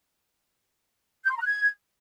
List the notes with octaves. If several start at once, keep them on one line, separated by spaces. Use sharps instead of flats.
G6
C6
A#5
F#6
G#6